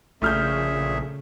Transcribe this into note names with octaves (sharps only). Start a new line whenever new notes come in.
A#1 A#2 C#3 A3 G#4 E5 F6 G6